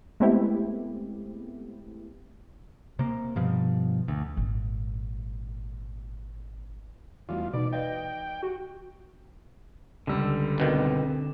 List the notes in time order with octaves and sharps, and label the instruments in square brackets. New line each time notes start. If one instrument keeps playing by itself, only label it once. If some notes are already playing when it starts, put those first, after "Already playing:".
[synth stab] G#3 A3 B3 C4 E4 G4
[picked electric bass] C3 A#3
G2 B2 F3
D2
[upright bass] G#1 A#2
[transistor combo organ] E2 F4 [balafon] G3 A3 F#4
[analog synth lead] B2 [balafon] E3 D#4 [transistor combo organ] D5
[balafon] B4 D5 F5 [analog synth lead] D#5 [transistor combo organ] G5
[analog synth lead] F#4 [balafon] G4
[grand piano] C#2 G3 [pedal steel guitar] D3 E6
[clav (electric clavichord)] G1 B2 D#3 [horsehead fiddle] C4